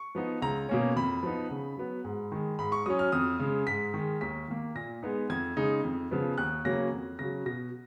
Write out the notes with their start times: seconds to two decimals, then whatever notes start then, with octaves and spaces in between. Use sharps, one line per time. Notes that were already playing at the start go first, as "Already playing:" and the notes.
Already playing: C#6
0.15 F3 B3 D#4
0.42 C#2 A#5
0.69 B2 A#3 C#4
0.96 F2 B5
1.23 F3 B3 D#4
1.50 C#3
1.77 F#3 B3
2.05 G#2
2.32 D#3 G#3
2.59 G#2 B5
2.72 C#6
2.86 F#3 C#4 D#6
2.99 F6
3.12 F2 D#6
3.40 C#3 G#3
3.67 G#2 B6
3.94 D#3 G#3
4.21 D#2 B6
4.48 D#3 A#3
4.75 A#2 A#6
5.03 G#3 B3 D#4
5.30 F2 G#6
5.56 C#3 G#3 D#4
5.84 F2
6.11 C#3 F3 B3
6.38 D#2 F#6
6.65 C#3 F#3 A#3 C#4 A#6
6.92 F2
7.19 C#3 F#3 A#6
7.46 B2 A#6